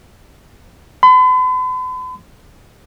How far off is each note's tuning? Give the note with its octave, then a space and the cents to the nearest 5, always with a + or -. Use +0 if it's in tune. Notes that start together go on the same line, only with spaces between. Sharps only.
B5 +45